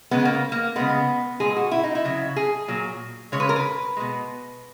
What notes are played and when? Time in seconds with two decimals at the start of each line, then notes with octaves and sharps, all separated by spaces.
0.11 C#3 G#3 B3
0.25 A#3
0.52 A#3
0.76 C#3 G#3 B3
1.40 A#2 G#3 G#4
1.56 F#4
1.71 E4
1.83 D#4
1.95 E4
2.05 C#3 F#3
2.36 G#4
2.68 A#2 F#3
3.32 C#3 G#3 C#5
3.40 B4
3.49 A#4
3.56 B4
3.97 B2 G#3